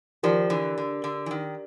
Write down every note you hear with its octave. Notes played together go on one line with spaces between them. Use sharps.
D#3 F3 G4 A#4 D5
D3 E3
D3
D3
E3
D#3